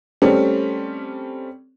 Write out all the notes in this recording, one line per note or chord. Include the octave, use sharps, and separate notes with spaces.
G3 A3 C4 C#4